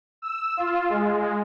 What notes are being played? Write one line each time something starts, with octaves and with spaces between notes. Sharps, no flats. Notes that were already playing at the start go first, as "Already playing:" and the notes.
E6
F4
G#3